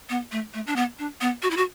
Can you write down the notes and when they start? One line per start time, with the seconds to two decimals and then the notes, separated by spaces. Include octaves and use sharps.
0.10 B3
0.32 A3
0.54 A3
0.67 D4
0.76 B3
0.99 D4
1.21 B3
1.43 F#4
1.51 E4
1.57 F#4